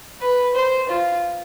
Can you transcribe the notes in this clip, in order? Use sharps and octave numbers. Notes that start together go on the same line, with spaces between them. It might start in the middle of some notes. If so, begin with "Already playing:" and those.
B4
C5
F4